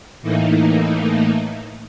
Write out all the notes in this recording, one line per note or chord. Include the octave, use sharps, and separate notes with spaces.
A2 E3 A3 A#3 D#4